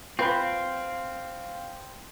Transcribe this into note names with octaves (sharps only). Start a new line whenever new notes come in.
C4 F4 B4 F5